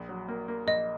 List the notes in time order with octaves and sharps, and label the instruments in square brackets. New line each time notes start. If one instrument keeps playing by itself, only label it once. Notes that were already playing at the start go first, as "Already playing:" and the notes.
Already playing: [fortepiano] A#1
F#3
A#3
A#3
[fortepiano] A#1 [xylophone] D#5